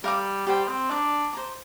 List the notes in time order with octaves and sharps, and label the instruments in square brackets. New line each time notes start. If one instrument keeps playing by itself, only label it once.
[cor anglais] G3 [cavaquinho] A#4 F5 D6
[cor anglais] G3 [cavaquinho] G4 C5 G5
[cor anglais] C4
[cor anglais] D4 [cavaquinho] D5 A#5 D6
[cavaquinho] C5 A#5 D6